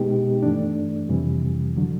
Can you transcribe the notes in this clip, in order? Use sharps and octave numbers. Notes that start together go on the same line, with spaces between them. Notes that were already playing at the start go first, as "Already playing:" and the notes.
Already playing: B2 G#3 B3 D#4 G4
G2 E3 A3 D4
F2 C3 E3 G3
D3 F#3